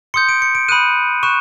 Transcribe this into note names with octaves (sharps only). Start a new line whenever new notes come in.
C6 D#6 G6 C#7
D7
C#7
D7
B5 D#6 F#6 D#7
C#6 F#6 E7